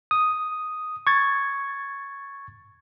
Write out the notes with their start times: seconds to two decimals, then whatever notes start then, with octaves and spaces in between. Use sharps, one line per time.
0.11 D#6
1.07 C#6 G#6 A6